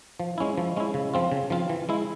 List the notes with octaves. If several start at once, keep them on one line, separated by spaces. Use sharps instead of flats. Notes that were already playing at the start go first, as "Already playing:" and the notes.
F3
G#3 C#4 E4
F3
G#3 C#4 E4
C#3
F3 C4 F4
C#3
F3 C4 F4
E3
G#3 E4